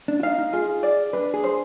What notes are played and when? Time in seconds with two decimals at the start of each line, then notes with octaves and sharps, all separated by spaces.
0.08 D4
0.20 F4
0.23 D#4 F5
0.39 D#4
0.53 F4 G#4
0.83 D5
1.13 D4 B4
1.34 G#4
1.44 C5